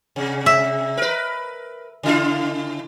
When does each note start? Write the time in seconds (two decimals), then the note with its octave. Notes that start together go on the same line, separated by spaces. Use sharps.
0.16 C3
0.46 E5
0.97 A#4 B4
2.03 C#3 E4 F4